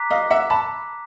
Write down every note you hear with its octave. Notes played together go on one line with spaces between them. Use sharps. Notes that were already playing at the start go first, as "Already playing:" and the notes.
Already playing: A#5 D6 F#6 B6
D#5 F5
E5 F#5
A5 B5